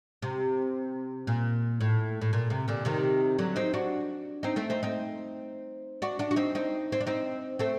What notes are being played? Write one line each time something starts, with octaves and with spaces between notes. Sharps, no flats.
C3
A#2
A2
A2
A#2
C3
A#2 D3
C3 D#3
D3 F#3
C4 D#4
D4 F#4
C4 D#4
A3 C4
C4 D#4
C4 D#4
D4 F#4
D4 F#4
F#4
C4 D#4
C4 D#4
C4
D4
C4 D#4
A3 C4